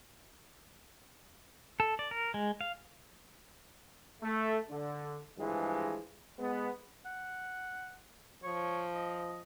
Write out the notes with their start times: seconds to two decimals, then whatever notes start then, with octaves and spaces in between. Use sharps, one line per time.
1.80 A4
1.99 D5
2.11 A#4
2.34 G#3
2.61 F5
4.23 A3
4.70 D3
5.38 G2 E3 F3 G#3
6.39 G#3 B3
7.06 F#5
8.43 F3 C#5
8.94 D#5